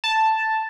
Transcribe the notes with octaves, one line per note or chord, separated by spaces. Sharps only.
A5